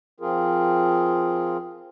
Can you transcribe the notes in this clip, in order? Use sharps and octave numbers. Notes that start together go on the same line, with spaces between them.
F3 C4 F4 G#4 A#4